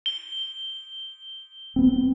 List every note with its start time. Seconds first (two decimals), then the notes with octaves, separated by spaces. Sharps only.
0.06 G7
1.76 B3 C4